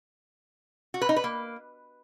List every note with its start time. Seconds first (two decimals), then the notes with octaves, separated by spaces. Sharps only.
0.94 F#4
1.01 B4
1.09 D#4
1.16 B4
1.24 A#3